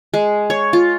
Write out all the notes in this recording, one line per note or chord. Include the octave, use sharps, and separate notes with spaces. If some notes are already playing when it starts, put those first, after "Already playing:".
G#3
C#5
F4